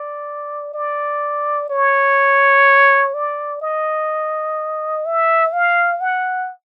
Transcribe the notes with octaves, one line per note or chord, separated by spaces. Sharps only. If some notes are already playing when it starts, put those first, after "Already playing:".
Already playing: D5
D5
C#5
D5
D#5
E5
F5
F#5